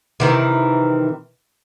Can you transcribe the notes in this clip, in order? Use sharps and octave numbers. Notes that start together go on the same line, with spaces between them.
C3 D#3 E3